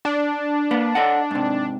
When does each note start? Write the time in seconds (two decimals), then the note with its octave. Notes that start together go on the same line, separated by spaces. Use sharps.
0.05 D4
0.71 A#3 B4
0.95 A4 D#5 F#5
1.31 G#2 C3